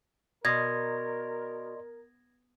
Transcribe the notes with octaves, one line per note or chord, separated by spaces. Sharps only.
B2 A#4 D5 D#5 C6 G#6 A#6